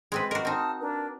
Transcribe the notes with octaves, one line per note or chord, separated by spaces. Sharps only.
G#3 C4 B4
F#4 A#4 D#5 D6
C4 D#4 A5 D#6 F6
D4 A#4 B4